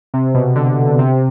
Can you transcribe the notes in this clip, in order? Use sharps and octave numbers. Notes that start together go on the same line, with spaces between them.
C3
B2
D3
C3